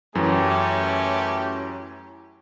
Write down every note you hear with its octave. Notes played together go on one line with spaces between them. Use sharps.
F#2 E3 F#3 A3 C#4 G4